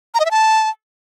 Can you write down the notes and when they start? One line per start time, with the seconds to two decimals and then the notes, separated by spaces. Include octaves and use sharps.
0.14 A#5
0.20 D#5
0.25 E5
0.31 A5